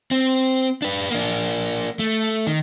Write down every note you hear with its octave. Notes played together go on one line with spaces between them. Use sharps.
C4
D4 B4
A#3 D4
A3
D#3